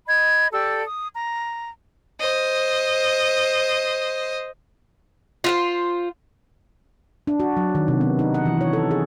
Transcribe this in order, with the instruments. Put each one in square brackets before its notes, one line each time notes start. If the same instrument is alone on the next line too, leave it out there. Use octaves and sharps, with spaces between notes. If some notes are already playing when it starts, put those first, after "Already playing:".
[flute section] D#5 B5 G#6
G4 A4 D5 E6
D#6
A#5
[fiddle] C5 D#5
[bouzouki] F4 F#4 C5
[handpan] D4
F#4
F#3
D#3
C3
B3
D#4
F#5
E3
C#5
A4
G#4